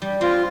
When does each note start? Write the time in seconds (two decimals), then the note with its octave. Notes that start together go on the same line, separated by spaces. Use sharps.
0.02 G3
0.21 C4 F4